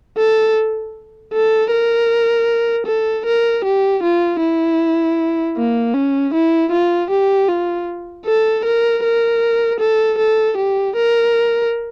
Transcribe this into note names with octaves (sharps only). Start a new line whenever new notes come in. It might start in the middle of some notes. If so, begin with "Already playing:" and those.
A4
A4
A#4
A4
A#4
G4
F4
E4
A#3
C#4
E4
F4
G4
F4
A4
A#4
A#4
A4
A4
G4
A#4